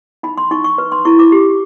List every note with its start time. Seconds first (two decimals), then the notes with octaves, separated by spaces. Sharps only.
0.23 D#4 B5
0.38 C6
0.51 D#4 C#6
0.64 C#6
0.78 B4
0.92 C6
1.05 E4 C#6
1.19 D6
1.32 G4